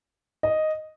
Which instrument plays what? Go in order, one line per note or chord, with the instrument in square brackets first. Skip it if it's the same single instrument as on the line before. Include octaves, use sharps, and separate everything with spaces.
[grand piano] D#5